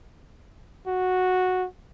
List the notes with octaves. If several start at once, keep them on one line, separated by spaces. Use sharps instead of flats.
F#4